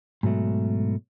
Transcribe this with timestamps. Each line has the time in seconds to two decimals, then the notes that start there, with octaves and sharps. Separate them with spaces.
0.23 G#2 B2 F#3 A3